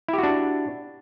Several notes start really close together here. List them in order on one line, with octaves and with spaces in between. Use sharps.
E4 G4 F#4 D4